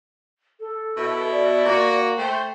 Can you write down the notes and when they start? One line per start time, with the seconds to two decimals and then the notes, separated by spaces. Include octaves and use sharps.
0.60 A4
0.97 B2 E4
1.31 D5
1.66 A#3 F#4
2.17 A3 C5 G5